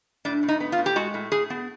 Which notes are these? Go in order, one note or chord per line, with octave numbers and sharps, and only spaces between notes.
A2 D4
A2
D#4
B3
F4
A2
G4
G#3 F#4
A2
A2 G#4
B3